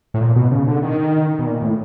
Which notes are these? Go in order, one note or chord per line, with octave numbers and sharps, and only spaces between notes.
A2
A#2
B2
C#3
D3
D#3
B2
A#2
A2